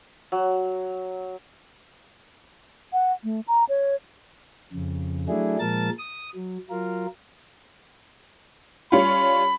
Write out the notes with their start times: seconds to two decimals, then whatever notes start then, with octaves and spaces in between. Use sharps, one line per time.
0.32 F#3
2.93 F#5
3.24 A3
3.48 A#5
3.69 C#5
4.73 F2 C#3
5.28 F#3 A3 D4 E4 G#4
5.60 A#2 F3 G#3 A#4 A5 A6
5.98 D#6
6.35 F#3
6.70 F#3 F4 A#4
8.92 G3 C#4 F4 B5